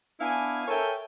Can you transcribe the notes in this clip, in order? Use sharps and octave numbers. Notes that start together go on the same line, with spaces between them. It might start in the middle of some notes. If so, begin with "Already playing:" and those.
B3 D4 E4 F5 G#5
A4 A#4 C#5 E5 G5 G#5